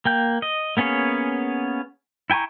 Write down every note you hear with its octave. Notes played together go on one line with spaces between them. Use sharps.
A#3 G5 G6
D#5
A#3 B3 C#4 G#4 C#5
E4 G5 G#5 A#5 C#6